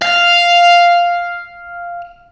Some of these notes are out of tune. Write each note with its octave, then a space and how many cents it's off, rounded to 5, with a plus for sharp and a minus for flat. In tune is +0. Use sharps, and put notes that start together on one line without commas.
F5 +0